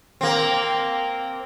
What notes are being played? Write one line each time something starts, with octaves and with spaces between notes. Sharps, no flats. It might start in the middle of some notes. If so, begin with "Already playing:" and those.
A#3 C4